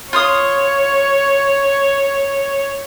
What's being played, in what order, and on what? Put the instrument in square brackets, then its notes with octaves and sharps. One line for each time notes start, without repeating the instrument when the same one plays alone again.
[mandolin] F4 C6 D#6 [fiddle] C#5